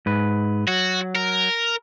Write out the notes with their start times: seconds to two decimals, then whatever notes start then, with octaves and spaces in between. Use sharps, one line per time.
0.06 G#2 B4
0.67 F#3 F#4
1.15 A#4